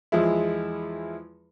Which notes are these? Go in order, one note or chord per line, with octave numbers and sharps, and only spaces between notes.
E2 F3 G#3 E4